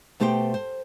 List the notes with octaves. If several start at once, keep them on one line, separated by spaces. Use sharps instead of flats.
B2 A3 G4 C5 E5 G5
C5